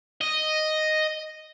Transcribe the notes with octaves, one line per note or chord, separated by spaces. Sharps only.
D#5